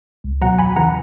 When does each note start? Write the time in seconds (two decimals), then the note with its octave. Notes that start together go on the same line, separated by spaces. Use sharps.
0.24 C#2
0.41 B2 F#3 F#5 A#5
0.59 E2 G#5 B5
0.76 C#3 E3 F#5 A#5